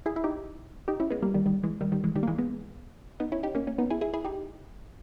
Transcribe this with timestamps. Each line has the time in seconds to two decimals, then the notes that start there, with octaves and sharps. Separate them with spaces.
0.06 E4 G#4
0.16 E4
0.24 D#4 G4
0.88 D#4 G4
1.00 C#4 E4
1.10 G#3 B3
1.22 G3 A#3
1.34 D#3 G3
1.46 D#3 G3
1.63 E3 G#3
1.81 D#3 G3
1.92 D#3 G3
2.04 E3 G#3
2.16 D#3 G3
2.23 A#3
2.28 E3 G#3
2.38 G#3 B3
3.20 B3 D#4
3.32 C#4 E4
3.43 D#4 G4
3.55 A#3 C#4
3.67 A#3 C#4
3.78 B3 D#4
3.90 E4 G#4
4.01 E4 G#4
4.14 E4 G#4
4.25 D#4 G4